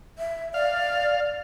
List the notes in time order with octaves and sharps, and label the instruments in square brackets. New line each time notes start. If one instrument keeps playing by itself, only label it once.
[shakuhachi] E5
[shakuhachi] D5 [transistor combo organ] F5